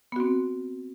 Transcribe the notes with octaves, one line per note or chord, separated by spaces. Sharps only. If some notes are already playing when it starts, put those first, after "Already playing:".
B3 C4 F#4